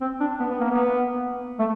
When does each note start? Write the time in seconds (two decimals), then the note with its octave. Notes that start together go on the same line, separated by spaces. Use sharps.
0.01 C4
0.20 D4
0.40 B3
0.51 B3
0.61 A#3
0.70 B3
1.59 A3